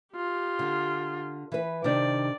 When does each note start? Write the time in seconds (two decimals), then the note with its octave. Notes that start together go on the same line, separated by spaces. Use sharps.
0.15 F4 G4
0.59 D3
1.52 E3 B4
1.84 C3 D#3 D4 D5